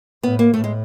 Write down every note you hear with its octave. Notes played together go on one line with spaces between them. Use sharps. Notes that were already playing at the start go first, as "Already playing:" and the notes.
A2 B3
A#3
A2 A3
G#3